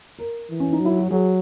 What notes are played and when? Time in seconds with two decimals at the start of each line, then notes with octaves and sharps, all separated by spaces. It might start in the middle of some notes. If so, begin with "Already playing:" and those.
0.19 A#4
0.50 E3
0.60 C#4
0.73 D#4
0.80 F#3
0.85 E4
0.99 F#4
1.11 F#3 G#4